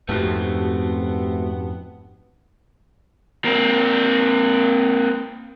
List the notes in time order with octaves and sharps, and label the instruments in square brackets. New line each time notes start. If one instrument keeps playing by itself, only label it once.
[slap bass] F2 G#2 [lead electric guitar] A3 C4 [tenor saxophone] B3 [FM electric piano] F#4 G4 A5
[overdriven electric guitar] A#3 C4